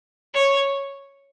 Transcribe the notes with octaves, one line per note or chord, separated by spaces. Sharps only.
C#5